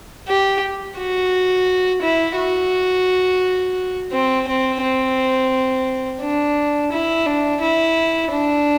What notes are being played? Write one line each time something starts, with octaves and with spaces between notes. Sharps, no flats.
G4
F#4
E4
F#4
C4
C4
C4
D4
E4
D4
E4
D4